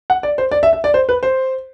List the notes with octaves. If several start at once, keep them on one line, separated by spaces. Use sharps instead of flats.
F#5
D5
C5
D5
E5
E5
D5
C5
B4
C5